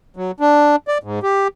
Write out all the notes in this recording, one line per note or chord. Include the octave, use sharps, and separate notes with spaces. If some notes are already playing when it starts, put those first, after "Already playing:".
F#3
D4
D5
G#2
G4